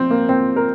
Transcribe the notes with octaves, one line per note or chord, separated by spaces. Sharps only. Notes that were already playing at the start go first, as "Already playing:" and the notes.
Already playing: A#2 F3 C4
A#3
C4
A#4